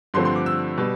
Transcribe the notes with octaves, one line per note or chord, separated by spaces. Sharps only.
G2 D3 F3 A3 C4 C6
C6
D6
E6
B2 G3